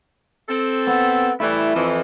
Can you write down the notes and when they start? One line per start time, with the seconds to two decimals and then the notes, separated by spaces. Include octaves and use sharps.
0.49 C4 A4
0.87 B3
1.40 E3 G3 A3 E4
1.74 F2 E3